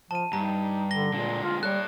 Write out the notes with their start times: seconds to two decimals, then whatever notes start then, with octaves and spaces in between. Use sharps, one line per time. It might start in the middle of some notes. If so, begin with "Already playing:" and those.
0.11 F3 A5 D#7
0.33 G2 D#4 A#5
0.91 D3 A#6 G7
1.14 A#2 D3 G#3
1.43 F4
1.63 G3 A4 C#5 F#6